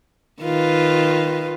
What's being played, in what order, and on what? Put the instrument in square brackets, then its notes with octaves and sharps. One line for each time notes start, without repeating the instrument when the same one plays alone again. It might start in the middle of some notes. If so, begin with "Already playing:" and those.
[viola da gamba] D#3 F4 B4